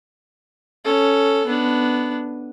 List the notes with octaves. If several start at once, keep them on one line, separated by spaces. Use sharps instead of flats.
C#4 A4
B3 D4